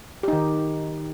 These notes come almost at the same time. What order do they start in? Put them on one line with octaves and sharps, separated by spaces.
G4 D#4 D#3